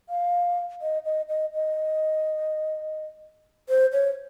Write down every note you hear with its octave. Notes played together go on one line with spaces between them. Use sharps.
F5
D#5
D#5
D#5
D#5
C5
C#5